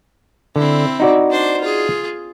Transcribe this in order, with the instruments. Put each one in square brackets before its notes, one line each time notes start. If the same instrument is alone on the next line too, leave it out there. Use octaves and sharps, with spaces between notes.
[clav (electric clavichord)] D3 [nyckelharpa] C4 E4
[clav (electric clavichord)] D#4 F#4 D5
[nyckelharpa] D4 C5
F4 G#4